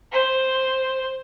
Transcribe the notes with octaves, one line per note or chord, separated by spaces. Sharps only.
C5